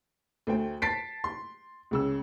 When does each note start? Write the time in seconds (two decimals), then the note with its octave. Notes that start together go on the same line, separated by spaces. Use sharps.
0.47 D2 A3 C5 G5
0.82 A5 A6 B6 C7 D7
1.24 C6
1.91 C#2 C#3 E6